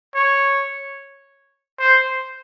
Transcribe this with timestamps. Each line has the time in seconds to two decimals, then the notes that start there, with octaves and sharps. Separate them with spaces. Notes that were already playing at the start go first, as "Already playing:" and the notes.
0.15 C#5
1.79 C5